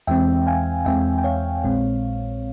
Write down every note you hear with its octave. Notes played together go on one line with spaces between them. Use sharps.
E2 E3 G#3 C4 E5 G5
F5 G#5
E2 E3 G#3 C4 E5 G5
G5
C#5 F5
A#1 A#2 G#3 C4